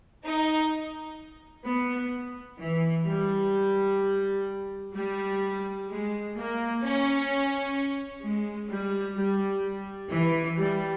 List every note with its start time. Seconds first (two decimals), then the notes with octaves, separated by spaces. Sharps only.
0.24 D#4
1.65 B3
2.60 E3
3.06 G3
4.94 G3
5.89 G#3
6.36 A#3
6.83 C#4
8.23 G#3
8.70 G3
9.17 G3
10.12 E3
10.58 G3